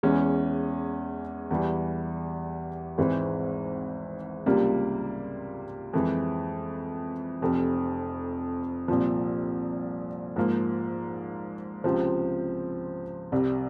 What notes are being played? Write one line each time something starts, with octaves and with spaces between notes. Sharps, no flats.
E2 E3 G#3 C#4
E2 E3 G3
G#1 G#2 E3 G#3 C4
C#2 C3 G3 A#3 F4
F2 E3 G#3
F1 F2 C3
C2 A#2 F3
G#2 F3 A#3
C#2 C3 F3 C4
C2 C3 G3